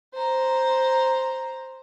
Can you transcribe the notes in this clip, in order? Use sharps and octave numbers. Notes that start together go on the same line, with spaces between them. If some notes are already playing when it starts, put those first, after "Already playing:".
C5 A#5